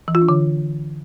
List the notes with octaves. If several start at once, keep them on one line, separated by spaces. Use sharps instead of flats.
E3
F4
D4
D3